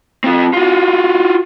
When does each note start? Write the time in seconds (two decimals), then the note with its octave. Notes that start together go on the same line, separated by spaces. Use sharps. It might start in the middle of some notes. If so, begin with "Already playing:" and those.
0.24 C4 F4
0.53 F4 F#4